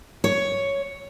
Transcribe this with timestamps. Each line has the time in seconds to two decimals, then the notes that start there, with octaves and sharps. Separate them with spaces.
0.24 C#5